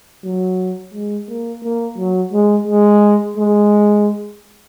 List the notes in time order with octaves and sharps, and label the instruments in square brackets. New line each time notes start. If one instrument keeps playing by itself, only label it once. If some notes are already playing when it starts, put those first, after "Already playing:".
[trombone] F#3
G#3
A#3
A#3
F#3
G#3
G#3
G#3